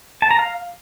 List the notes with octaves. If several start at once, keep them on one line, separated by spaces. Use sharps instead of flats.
A5
A#5
F5